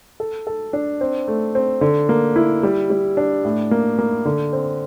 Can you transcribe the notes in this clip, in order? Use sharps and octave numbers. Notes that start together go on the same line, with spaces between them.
A4
A4
D4
C4
A3
C4
D3
A#3
E4
G3
G3
D4
A2
A#3
A#3
D3
C4